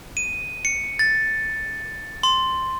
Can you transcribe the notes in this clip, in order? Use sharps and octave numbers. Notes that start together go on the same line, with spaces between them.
D#7
C#7
A6
C6